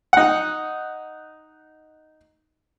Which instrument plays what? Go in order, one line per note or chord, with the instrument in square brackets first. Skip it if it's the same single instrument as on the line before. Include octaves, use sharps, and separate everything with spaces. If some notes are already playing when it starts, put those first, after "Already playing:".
[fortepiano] D#4 F#5